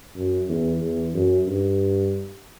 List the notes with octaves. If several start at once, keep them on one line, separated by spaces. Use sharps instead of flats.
F#2
E2
E2
F#2
G2